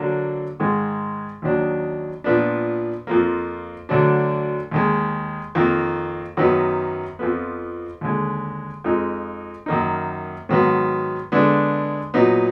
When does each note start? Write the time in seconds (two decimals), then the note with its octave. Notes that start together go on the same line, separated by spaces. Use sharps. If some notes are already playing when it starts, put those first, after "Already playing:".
Already playing: D3 F#3 A#3 D4
0.60 G#2 D#3 G#3
1.42 D#2 D#3 F#3 D4
2.24 A#2 F3 B3 D4
3.07 F2 F3 A#3
3.89 D2 D3 F#3 D4
4.72 D#2 D#3 G#3
5.55 F2 D#3 A#3
6.37 F#2 D#3 F#3 B3 D#4
7.19 F2 F3 B3
8.01 D#2 D3 G#3
8.84 F2 F3 G#3 D#4
9.66 F#2 D#3 A#3 D#4
10.49 G#2 D#3 F#3 B3
11.32 D3 G#3 B3 D4
12.14 A#2 F#3 B3 D#4